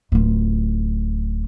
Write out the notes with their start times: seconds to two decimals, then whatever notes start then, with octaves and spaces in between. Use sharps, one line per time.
0.12 D1 F4